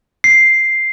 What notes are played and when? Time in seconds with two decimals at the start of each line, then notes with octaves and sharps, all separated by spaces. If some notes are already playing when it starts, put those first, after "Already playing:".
0.24 C7